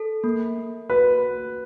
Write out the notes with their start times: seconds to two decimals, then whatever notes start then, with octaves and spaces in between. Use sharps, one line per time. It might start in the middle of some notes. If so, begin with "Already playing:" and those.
Already playing: A4
0.24 A#3
0.58 A#3
0.90 F#4 B4